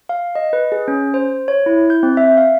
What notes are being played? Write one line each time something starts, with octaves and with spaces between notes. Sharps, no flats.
F5
D#5
B4
G#4
C#4
C5
C#5
E4
G6
C4
E5
F5